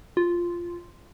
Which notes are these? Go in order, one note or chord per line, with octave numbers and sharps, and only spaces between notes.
F4